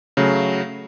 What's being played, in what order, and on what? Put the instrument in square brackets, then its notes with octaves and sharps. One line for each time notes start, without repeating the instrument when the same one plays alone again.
[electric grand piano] C#3 F#3 A3